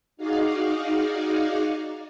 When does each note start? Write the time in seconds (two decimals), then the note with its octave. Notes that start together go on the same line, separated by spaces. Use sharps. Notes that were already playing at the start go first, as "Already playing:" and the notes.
0.17 D#4 F#4 G#4 D5 F5